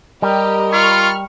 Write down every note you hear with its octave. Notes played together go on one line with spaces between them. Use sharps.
G3 G4 A#4 D#5
F4 B5 C#6 F6